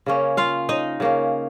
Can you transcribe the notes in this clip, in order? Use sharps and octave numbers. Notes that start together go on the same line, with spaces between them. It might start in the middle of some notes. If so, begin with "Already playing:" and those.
C#3 A#3 C#4
F4 F5
D#4 D#5
C#3 A#3 C#4